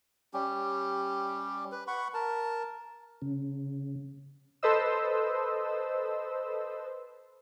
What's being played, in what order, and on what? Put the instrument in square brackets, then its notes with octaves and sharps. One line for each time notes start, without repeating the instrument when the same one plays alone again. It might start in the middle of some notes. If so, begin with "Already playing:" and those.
[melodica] G3 C#4 G4
B4
F#5 B5 C#6
A#4 A5
[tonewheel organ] C#3
[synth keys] A4 B4 C5 D#5 E6